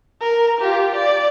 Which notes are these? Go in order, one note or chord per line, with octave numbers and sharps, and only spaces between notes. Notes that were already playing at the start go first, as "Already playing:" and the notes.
A#4
F4 G4
D5